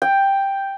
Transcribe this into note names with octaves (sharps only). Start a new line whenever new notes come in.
G5